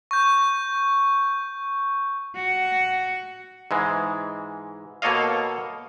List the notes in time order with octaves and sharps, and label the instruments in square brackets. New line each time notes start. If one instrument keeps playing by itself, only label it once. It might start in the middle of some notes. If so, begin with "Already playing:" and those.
[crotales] C#6 G6
[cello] F#4
[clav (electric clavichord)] G#2 E3 G#3
B2 A#3 A4 C#5 D#5 F5